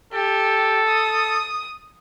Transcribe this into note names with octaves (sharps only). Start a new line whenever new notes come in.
G4 A4
D#6